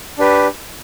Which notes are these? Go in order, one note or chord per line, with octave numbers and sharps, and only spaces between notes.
D4 G4 B4